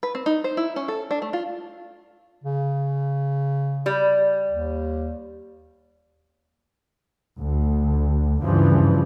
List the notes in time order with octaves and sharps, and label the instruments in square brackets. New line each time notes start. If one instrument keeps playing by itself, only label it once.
[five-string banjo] B4
C4
D#4
C5
E4
C#4
A4
D4
A3
F4
[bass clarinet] C#3
[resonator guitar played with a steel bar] G3
[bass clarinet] D#2
[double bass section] D2
G2 C#3 E3 F3